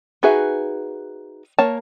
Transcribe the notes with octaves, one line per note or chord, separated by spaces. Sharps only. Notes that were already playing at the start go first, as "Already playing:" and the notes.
D#4 F#4 G#4 B4 E5
A#3 C#5 A5